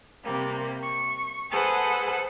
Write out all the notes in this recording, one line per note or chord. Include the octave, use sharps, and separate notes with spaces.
C3 G3 A#3
C#6
G#4 A4 B4 C5 F#5